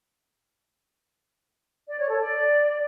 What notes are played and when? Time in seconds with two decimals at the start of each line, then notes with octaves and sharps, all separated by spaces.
1.88 D5
1.98 C#5
2.09 A4
2.19 D5